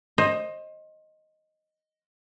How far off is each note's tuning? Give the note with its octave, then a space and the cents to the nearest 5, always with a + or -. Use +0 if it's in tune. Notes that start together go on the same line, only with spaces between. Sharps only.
C5 +25 D#5 +0